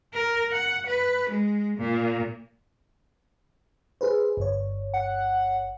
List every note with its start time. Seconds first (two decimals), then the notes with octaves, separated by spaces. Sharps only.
0.13 A#4
0.52 F#5
0.87 B4
1.30 G#3
1.78 A#2
4.01 G#4 B4 C5
4.37 G1 C#5
4.94 F#5